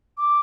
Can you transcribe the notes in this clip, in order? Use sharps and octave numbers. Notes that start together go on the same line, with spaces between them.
D6